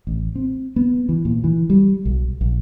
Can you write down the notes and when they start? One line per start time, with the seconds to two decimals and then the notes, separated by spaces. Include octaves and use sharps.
0.07 A1
0.35 C4
0.76 B3
1.09 E3
1.25 A#2
1.44 E3
1.70 G3
2.05 B1
2.41 A#1